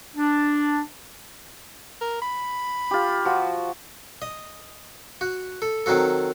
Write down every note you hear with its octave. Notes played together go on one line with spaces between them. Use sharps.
D4
A#4
B5
F4 G4
F3 F#4
D#5
F#4
A4
D#3 F#3 C4 F#4 A4